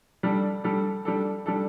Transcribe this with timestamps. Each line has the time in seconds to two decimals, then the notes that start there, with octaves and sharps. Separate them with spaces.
0.23 G3 D4 A4
0.64 G3 D4 A4
1.05 G3 D4 A4
1.46 G3 D4 A4